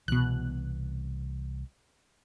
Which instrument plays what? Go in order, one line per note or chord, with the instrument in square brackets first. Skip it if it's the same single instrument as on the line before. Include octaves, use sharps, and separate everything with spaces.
[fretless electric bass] C2 E3 [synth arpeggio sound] B2 F#6